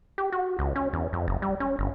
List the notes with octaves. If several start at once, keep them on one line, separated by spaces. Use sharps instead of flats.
G4
F#4
C#2
C#4
E2
F2
F#1
G3
C#4
G1